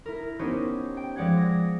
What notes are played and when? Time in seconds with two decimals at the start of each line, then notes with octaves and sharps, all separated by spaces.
0.06 E4 A#4
0.39 B3 C#4 D#4 G4 C5
0.97 G5
1.16 F3 G#3 D5 F#5 G#6
1.37 A#6